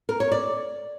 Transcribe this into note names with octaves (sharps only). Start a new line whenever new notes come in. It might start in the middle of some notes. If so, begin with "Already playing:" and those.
A#4
C#5
D5